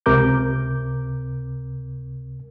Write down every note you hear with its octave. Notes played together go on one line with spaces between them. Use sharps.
C#2 C3 A#4 D6 G6